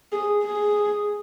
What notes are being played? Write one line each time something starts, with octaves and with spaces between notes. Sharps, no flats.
G#4
G#4